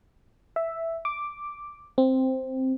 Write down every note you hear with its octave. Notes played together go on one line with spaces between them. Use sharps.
E5
D6
C4